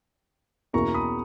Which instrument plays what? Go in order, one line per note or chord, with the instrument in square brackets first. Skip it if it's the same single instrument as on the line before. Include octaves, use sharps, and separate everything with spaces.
[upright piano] E2 B2 A#3 C#4 E4 [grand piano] A#5 C#6
[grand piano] B5 D#6